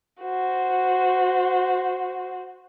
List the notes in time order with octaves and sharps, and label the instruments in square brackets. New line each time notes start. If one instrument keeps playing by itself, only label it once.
[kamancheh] F#4 C5